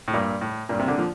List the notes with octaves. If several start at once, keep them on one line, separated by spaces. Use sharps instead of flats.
A2
G2 A#2
A2
G2 A#2
C3
A#2 D3
F3